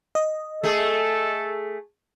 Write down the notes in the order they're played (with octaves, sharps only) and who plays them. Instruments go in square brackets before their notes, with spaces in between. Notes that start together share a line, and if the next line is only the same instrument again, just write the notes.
[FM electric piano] D#5
[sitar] A3 G#4 [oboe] A4